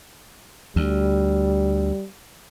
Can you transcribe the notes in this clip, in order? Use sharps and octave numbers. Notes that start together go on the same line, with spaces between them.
D2 G3